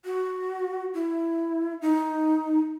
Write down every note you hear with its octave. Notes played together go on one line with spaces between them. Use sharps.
F#4
E4
D#4